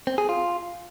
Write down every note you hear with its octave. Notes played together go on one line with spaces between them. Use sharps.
C4
G#4
F4